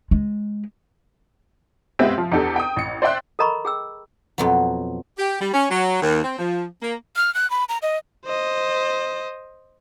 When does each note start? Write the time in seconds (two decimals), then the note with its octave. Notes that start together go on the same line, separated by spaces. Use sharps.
0.11 G#3
1.99 G#3 B3 C4 F4 G4 E5
2.18 F3
2.32 E2 D4 G4 A4
2.56 G5 D#6
2.76 A1 C#7
3.02 C5 D5 E5 G5 C6 F#6
3.39 A4 A#4 D#5 A#5 B5 C#6
3.65 G#4 G5 E6
4.38 F2 B2 F#3
5.19 G4
5.41 G3
5.54 C#4
5.70 F#3
6.02 D#2
6.24 C4
6.39 F3
6.82 A#3
7.16 F6
7.34 F#6
7.50 B5
7.69 A#5
7.82 D#5
8.25 C5 D#5